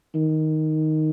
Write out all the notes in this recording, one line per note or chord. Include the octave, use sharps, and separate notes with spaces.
D#3